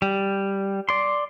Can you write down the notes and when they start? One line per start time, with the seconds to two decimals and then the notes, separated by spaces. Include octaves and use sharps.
0.02 G3
0.89 D5 C6